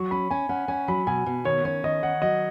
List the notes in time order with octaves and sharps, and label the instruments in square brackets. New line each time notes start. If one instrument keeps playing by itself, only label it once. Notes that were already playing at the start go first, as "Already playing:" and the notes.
Already playing: [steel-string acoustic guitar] F#3 [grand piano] C#6
[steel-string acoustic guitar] C#4 [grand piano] B5
[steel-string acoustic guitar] C#4 [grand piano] G#5
[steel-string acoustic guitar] C#4 [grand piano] F#5
[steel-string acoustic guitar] C#4 [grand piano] G#5
[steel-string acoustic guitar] F#3 [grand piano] B5
[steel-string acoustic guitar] B2 [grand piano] G#5
[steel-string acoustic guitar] B2
[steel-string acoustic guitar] D#3 [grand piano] C#5
[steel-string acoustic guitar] C#4 [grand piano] C#5
[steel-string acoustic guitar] D#3 [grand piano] D#5
[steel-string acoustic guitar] D#3 [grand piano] F#5
[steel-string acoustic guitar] F#3 [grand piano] D#5